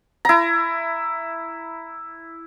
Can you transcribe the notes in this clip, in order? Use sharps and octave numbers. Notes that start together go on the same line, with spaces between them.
E4 A#5